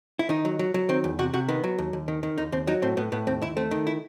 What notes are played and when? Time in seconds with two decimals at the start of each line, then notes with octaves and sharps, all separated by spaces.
0.19 E4
0.29 D#3 D#4
0.45 F#3
0.59 F#3
0.74 F#3
0.89 D#3 C4
1.04 E2
1.19 C3 F#4
1.34 C3 F#4
1.48 D#3 B3
1.64 F#3
1.78 D#2
1.93 D#2
2.08 D#3
2.23 D#3
2.38 D#2 D#4
2.52 D#2 C4
2.67 F#3 D#4
2.82 A2 C4
2.97 A2 B3
3.12 A2 B3
3.27 D#2 C4
3.42 D#2 E4
3.57 A3 C4
3.71 D#3
3.87 E4